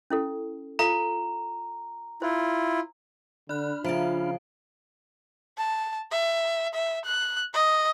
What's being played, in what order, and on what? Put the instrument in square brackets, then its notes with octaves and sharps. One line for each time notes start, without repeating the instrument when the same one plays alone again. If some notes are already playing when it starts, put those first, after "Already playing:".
[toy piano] C#4 E4 A4
[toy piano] F4 A4 F5 [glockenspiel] A#5
[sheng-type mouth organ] E4 F4 [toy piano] C5
[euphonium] D3 [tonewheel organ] D4 B5 F6 [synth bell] D5 F#6
[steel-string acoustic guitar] C#3 F3 [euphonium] F4 [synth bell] E5 A#5 D7
[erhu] A5
E5
E5
F#6
D#5